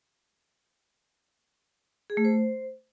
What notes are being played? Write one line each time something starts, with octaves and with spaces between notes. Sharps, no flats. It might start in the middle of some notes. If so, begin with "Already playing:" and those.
G#4
A3
C5